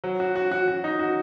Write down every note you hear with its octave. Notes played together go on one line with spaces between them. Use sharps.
F#3
F#4
F#4
F#4
F#4
D#4
F#4